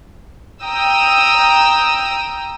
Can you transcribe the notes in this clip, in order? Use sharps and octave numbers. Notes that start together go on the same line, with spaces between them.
G5 A#5 D#6 E6